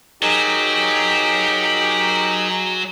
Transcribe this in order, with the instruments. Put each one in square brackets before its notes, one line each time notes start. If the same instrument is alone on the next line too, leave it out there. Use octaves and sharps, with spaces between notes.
[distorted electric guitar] F#3 [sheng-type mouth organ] D#4 G#4 A#4 [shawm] G4